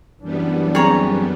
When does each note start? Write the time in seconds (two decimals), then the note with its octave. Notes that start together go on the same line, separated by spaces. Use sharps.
0.23 F#2 E3 G3 B3 D4
0.75 C4 G#4 C#5 A#5